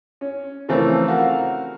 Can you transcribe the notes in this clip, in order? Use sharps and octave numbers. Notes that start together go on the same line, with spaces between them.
C#4
C#3 E3 F3 A3 C4 A#4
F#4 A#4 F5